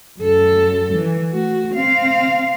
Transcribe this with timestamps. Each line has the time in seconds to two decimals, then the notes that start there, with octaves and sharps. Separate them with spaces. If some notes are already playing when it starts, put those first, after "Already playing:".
0.20 F#2 A4
0.93 E3
1.31 A3 F#4
1.74 C4 F5